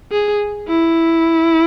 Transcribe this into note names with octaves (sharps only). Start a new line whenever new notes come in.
G#4
E4